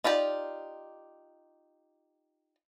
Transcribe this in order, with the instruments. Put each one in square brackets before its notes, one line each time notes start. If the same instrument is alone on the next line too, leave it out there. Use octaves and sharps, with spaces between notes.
[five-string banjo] D#4 F4 G4 D5